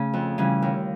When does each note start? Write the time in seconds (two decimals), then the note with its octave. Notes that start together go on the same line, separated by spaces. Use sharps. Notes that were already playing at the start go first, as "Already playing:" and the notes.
Already playing: C#3 A3
0.13 F2
0.38 C#3 E3 G3
0.62 D#2